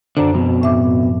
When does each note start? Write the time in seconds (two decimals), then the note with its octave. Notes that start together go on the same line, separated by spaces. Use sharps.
0.17 F#2 D3 D4 C5
0.34 F2 B2
0.62 A2 E5 D6